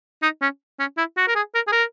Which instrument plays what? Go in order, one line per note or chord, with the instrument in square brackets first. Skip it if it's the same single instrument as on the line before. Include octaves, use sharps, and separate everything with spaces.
[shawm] D#4
C#4
C#4
E4
F#4
A#4
G#4
A#4
G#4
A#4